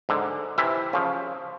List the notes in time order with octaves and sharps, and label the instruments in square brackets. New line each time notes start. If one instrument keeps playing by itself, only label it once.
[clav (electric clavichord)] G#2 D3
C3 E3 E5
C#3 F3